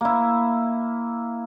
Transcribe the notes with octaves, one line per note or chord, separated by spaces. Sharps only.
A#3 E4